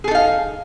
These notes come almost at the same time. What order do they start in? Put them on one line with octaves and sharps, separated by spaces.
G#4 A4 D#4 F5